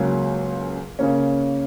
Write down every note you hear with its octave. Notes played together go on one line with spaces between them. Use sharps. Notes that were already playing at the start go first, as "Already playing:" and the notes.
Already playing: C#2 C#3 F#3 A#3 C#4
C#3 A#3 C#4